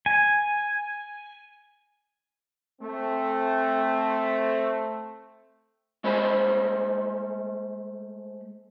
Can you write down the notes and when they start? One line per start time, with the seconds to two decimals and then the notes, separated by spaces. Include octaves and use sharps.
0.06 G#5
2.82 A3 C4
6.04 G#3 A3 C5 B5